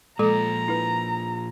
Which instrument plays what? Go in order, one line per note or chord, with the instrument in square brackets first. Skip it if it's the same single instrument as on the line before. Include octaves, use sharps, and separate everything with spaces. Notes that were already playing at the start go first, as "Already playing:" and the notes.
[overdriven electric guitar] A#2 F3 [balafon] G#3 A4 D6 [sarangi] A#5
[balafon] E4 B4